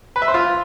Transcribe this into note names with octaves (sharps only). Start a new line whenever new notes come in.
B4
E5
C5
F4